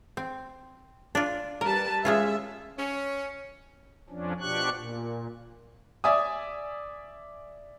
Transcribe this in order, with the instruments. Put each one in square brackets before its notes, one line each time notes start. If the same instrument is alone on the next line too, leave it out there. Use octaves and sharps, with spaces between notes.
[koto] C4
D4 F4
[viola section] G3 B4 A5 [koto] A#4
[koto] G#3 C#4 F4 [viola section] E5
[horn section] C#4
[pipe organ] F2 F3 C#4 D4
B2 F3 D4 G4 C#6 F#6
A#2
[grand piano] D5 E5 G#5 D#6